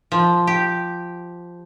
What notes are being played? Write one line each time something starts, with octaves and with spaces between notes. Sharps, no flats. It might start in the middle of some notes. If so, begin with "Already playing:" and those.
F3
G4